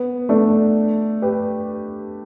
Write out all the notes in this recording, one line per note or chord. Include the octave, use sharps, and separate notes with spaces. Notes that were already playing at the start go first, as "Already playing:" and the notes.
Already playing: B3
A3 D4
G4 B4